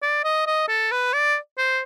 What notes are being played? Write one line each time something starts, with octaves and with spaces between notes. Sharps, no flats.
D5
D#5
D#5
A4
B4
D5
C5